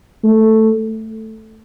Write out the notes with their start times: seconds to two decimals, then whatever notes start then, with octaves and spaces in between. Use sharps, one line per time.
0.24 A3